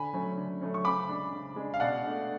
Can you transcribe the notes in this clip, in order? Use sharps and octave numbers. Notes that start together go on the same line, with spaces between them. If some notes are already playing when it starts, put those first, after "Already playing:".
Already playing: D3 G#5 B5
F#3 A3 C#4
D3
F#3 A3 C#4
C#6
C#3 B5 D6
G#3 D4
C#3
G#3 D4
F5
B2 D5 F#5
A3 D4